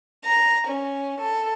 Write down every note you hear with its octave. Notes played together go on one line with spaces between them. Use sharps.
A#5
C#4
A4